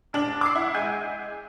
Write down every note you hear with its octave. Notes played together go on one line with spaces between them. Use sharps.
F1 D4 F#7
D6 E6 C7
E4 F#5
G#3 G#5 G6